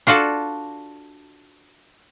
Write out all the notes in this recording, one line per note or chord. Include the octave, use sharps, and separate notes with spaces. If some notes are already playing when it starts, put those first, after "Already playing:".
D4 F4 F#4 A4